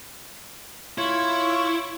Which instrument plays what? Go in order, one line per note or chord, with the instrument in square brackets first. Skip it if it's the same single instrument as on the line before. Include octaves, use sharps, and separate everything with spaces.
[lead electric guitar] E4 [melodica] F4 C#5 C#6